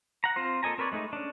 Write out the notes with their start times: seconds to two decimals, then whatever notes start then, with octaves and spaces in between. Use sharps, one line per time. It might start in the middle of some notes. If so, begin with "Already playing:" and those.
0.24 F#5 A#5
0.36 C4 F4 C5
0.63 A#3 A4 D#5 G#5 A#5
0.78 C4 A#4 B4 C#5 D5
0.92 G#3 A3 D#4
1.13 C#4 D4